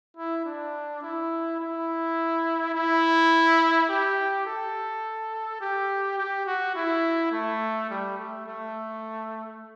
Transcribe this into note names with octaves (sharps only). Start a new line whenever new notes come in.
E4
D4
E4
E4
E4
G4
A4
G4
G4
F#4
E4
A3
G3
A3
A3